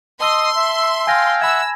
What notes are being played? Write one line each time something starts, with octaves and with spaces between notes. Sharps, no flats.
D#5 A5 C6 D#6 E6
E5
F5 G5 G#5 G#6 A#6
E5 F#5 B5 E6 G#6